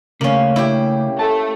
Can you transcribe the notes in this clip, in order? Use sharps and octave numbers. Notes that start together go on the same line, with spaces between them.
C#3 A3 A#3 C#4
E4 G4
A3 A5